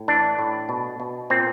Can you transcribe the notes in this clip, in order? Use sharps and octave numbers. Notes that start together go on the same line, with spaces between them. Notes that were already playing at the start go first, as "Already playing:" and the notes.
Already playing: A2
E3 D4
A2
B2
B2
A#2 C4